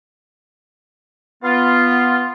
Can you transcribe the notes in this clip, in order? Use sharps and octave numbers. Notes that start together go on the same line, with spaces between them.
B3 F4